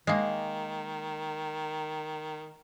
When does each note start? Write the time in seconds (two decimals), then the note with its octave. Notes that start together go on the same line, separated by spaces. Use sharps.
0.07 D#3 G#3 A#3